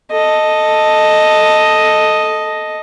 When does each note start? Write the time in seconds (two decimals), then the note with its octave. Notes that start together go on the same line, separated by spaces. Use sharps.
0.12 A4 D#5